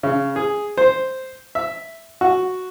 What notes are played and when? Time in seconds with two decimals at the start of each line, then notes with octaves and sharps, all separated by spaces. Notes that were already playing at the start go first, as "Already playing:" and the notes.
0.03 C#3
0.36 G#4
0.78 C5
1.55 E5
2.21 F#4